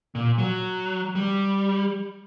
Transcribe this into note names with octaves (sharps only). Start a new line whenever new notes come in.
A#2
F#3
G3